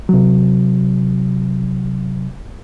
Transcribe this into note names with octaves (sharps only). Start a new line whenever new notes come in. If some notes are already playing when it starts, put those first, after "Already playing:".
C3 F#3